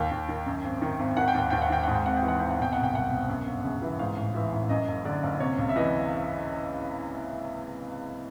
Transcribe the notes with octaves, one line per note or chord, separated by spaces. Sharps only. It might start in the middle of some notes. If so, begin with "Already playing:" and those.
Already playing: D#2 D#3 G5
D#2
D#3
F#2
G#1
D#3
G#1
D#3 F#5
G5
D#2 F#5
D#2 G5
F#5
D#3 G5
G#2 F#5
G5
G#1 F#5
G5
E3
F#5
G#1 G5
F#5
B2 G5
C2 F#5
G5
C2 F#5
B2
F#2
G1
C#3
E3
G#2 F5
A1
E3 E5
A1
F#2 D#5
F#1
D3 D5
F#1
C3 C#5
C#2
E5
E3 D#5